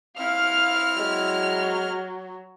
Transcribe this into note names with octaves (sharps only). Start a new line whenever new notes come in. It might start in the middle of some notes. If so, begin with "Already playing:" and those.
C4 E4 F5 F6
F#3 G#3